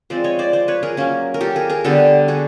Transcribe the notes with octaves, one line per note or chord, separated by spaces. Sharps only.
F3 G#3 C4 C5 D5
C#5 D#5
C5 D5
C5 D5
B4 C#5
G#4 A#4
F#3 A#3 C#4
A#4
G4 A4
G#4 A#4
G#4 A#4
D3 G3 B3 G4 A4
F#4 G#4